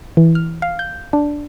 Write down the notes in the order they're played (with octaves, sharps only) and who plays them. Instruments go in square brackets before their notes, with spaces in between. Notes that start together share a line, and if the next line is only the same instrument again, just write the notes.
[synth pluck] E3
F6
F5
G6
D4